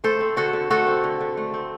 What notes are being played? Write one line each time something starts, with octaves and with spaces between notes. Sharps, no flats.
A3 A4 C5
C4
D3 F#4 A4
D3
A3 F#4 A4
C4
D3
D3
A3
C4